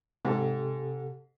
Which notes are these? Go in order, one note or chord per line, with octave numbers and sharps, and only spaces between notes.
G#2 C3 G4 A4